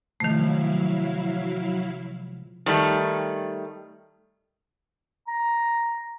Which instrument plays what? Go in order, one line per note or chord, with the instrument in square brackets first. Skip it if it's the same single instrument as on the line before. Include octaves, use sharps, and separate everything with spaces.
[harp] C3 F3 G#3 [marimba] D#3 A3 [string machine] F#3 E4 F5
[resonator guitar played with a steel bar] D#3 G3 A3
[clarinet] A#5